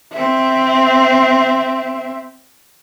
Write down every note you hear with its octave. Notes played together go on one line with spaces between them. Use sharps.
C4 E5